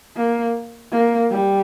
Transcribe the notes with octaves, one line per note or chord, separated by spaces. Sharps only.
A#3
A#3
G3